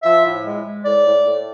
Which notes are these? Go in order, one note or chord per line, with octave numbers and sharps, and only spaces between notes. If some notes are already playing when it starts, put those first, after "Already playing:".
F3 E5
A2
G#3
G#3
A2 D5
A2
A2